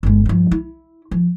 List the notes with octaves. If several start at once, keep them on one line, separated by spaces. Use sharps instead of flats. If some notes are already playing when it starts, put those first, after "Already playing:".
G1 G#3
G2 F3
E4
F3